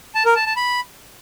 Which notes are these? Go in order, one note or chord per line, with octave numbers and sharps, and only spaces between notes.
A5
A#4
A5
A5
B5